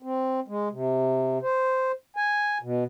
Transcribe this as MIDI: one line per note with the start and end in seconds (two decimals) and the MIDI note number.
0.03 0.40 60
0.48 0.68 56
0.71 1.38 48
1.42 1.92 72
2.17 2.58 80
2.63 2.84 47